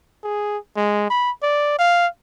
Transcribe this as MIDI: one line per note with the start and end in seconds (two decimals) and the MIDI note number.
0.23 0.58 68
0.76 1.09 56
1.10 1.31 83
1.43 1.75 74
1.79 2.07 77